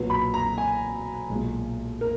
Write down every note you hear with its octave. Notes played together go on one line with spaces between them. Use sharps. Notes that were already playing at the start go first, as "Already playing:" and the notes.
Already playing: B1 A#2 F#3 B3
B5
A#5
G#5
B1 A#2 G#3
A#4